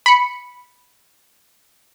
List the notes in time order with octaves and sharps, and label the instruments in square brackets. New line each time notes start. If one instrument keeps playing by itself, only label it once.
[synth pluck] B5 C#7